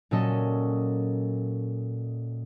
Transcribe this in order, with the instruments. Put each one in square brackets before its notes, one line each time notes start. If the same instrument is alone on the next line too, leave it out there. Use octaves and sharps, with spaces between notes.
[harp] A#2 F#3 C#4 A4 D#5